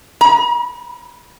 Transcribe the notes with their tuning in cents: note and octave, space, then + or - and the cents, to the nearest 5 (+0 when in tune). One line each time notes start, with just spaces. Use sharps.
A#5 +40